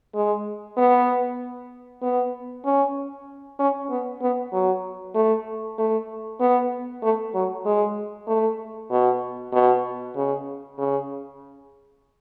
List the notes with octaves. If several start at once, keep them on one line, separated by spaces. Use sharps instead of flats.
G#3
B3
B3
C#4
C#4
B3
B3
F#3
A3
A3
B3
A3
F#3
G#3
A3
B2
B2
C#3
C#3